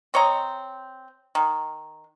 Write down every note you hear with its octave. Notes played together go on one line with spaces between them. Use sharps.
C4 C#5 D#5 A#5
D#3